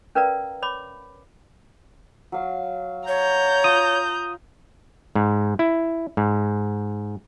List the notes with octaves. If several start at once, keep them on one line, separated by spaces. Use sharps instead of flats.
C#4 A#4 B4 D5 F5 A#5
C#5 B5 D6
F#3 F5
C#5 A#5 G6
F4 D#6
G#2
E4
G#2